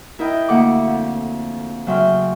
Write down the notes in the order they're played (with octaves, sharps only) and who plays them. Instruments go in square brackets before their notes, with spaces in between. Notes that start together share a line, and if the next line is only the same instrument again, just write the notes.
[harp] E4 A#4 D#5 G5
D2 D3 A#3 A4 F#5 D6
F2
C#3 F#3 E5 G5 C6 F6